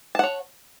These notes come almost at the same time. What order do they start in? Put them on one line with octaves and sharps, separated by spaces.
A5 F#5 C#5